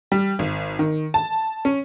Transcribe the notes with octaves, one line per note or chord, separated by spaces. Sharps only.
G3
G#1
D#3
A5
C#4